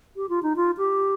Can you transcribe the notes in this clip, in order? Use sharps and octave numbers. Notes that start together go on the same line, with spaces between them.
G4
F4
D#4
F4
G4